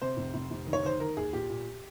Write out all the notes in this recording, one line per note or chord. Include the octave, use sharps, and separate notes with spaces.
C3 C5
F1
F1
F1
D#3
C#5
D#3 C5
D#3 A#4
D#2 G#4
A#2 G4
A#2